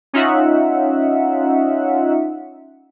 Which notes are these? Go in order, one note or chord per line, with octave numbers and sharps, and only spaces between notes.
C#4 D#4 F4 E5 F#5